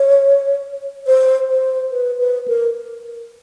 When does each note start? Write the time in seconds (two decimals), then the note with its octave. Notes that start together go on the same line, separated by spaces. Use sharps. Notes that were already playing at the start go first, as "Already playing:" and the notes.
Already playing: C#5
1.07 C5
1.49 C5
1.91 B4
2.19 B4
2.48 A#4